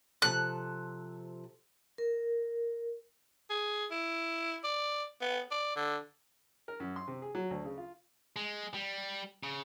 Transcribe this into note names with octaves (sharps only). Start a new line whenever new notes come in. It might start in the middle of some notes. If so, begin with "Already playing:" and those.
C3 F3 A4 F#6
A#4
G#4
E4
D5
B3
D5
D3
A#4
F#2
C6
C3
G#4
F#3
D2
C#3
F4
G#3
G3
C#3